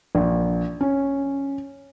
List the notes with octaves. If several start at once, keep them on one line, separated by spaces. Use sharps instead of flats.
A#1
C#4